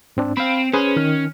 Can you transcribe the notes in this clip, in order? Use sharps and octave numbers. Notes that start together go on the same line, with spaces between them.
G#2 C4 D4
C4 F5 B5
C#4 G#4 B4 C5
D#3 F6